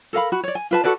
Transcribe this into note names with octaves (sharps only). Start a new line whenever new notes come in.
A4 A#4 F5 B5
F#4 B5
C#5 D5
G#5
F4 B4 A5
F#4 A4 B4 D5